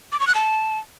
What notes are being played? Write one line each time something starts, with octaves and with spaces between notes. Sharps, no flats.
D6
C#6
F#6
A5